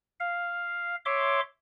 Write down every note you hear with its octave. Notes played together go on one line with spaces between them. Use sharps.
F5
C#5 E5 C6 D6